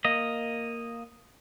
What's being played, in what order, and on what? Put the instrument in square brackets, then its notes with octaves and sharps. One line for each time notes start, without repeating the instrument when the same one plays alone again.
[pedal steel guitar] A#3 D#5